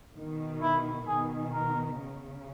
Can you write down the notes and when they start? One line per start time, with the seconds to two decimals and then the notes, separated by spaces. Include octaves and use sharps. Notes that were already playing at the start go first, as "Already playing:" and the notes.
0.16 B2 D#3
0.62 E4
1.08 B2 D#3 G#4
1.54 A#4
1.99 C#3